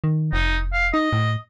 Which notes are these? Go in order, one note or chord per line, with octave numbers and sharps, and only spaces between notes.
D#3
F1 D#4
F5
D#4 D#5
A2